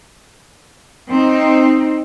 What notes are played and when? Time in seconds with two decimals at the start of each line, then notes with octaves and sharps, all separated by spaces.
1.09 C4 D#4